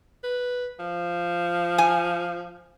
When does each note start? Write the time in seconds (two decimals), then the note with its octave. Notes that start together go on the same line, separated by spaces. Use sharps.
0.23 B4
0.79 F3
1.78 G#5